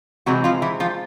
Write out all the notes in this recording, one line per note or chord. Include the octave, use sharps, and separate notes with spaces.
C3 E3 F#3 G#3 C4 F#4
F3 F4
E3 E4
F3 F4